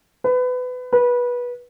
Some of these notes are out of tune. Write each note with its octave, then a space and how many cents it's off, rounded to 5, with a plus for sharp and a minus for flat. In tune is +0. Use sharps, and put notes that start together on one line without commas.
B4 +25
B4 -20